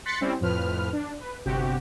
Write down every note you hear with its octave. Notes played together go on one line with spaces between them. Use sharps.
C6 F#6 A6 B6 C#7
G3 C4 C#4 E4
F2 A2 F3 B4 F6
D4
B4
G1 C3 F#4 G4